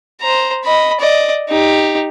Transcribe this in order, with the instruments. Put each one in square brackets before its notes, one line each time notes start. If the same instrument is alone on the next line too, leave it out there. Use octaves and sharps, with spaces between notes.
[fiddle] C5 A#5
D#5 B5
D5 D#5
D#4 G4